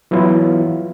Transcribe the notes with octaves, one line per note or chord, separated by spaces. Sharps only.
E3 F#3 B3 E4 F4